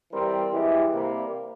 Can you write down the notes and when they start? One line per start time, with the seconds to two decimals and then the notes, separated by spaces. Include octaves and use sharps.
0.11 E3 G3 C4 G4 A#4
0.52 G2 E3 G#3 E4 G4
0.93 C2 C3 G3 A#3